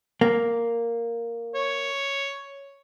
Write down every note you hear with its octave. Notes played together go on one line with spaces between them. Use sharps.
A#3
C#5